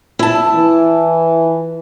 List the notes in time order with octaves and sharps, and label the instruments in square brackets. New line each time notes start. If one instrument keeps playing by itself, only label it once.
[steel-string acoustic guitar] E4 A5
[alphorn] E3